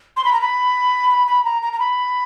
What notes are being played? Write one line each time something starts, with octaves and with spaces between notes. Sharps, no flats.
C6
B5
A#5
B5
B5
B5
A#5
A#5
A#5
B5